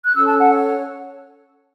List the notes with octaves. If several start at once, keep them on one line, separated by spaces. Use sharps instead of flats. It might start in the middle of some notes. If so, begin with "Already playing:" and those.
F#6
C#4 A4 C#5 E6
A5
F#5
C#5